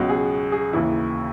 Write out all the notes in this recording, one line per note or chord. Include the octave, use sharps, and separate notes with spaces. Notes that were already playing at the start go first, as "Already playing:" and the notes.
Already playing: C#2 B2 F#3 F#4
G#4
G#4
D#2 C#3 E3 E4